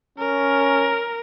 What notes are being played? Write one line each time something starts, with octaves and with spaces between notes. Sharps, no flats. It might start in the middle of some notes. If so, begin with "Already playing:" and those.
C#4 A#4